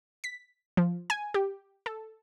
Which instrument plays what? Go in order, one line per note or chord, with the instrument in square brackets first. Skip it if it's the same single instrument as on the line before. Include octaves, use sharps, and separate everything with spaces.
[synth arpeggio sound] B6
F3
G#5
G4
A4